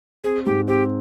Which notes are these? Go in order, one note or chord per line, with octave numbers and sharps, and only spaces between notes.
C4 G#4
G#2 G4
C4 G4